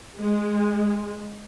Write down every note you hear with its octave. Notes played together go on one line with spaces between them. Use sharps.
G#3